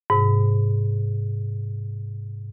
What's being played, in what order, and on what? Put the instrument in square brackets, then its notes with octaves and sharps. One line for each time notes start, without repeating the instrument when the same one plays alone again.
[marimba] G#2 C3